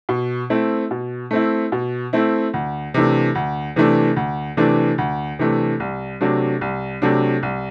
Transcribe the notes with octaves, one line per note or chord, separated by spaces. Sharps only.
B2
A3 C4 E4
B2
A3 C4 E4
B2
A3 C4 E4
D2
C3 E3 A3 D4
D2
C3 E3 A3 D4
D2
C3 E3 A3 D4
D2
C3 E3 A3 D4
C2
C3 F#3 A3 D4
C2
C3 F#3 A3 D4
C2